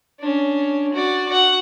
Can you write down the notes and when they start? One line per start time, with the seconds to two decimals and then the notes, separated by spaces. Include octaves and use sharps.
0.20 C#4 D4
0.94 F#4 D5
1.28 F#4 F#5